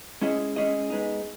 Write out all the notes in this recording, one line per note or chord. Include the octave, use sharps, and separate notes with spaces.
G#3 C#4 E4 G#4 D#5
G#3 C#4 E4 G#4 D#5
G#3 B3 D#4